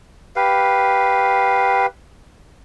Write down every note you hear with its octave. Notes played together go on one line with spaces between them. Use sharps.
G4 B4 F5